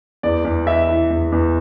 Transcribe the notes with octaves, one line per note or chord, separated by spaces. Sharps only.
E2 D5
E2
E3 E5
E3
E2
E2